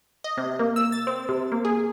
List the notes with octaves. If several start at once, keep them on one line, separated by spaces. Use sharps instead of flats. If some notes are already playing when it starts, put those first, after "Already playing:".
D#5
C3
A#3
E6
A6
C4
C3
A#3
G#4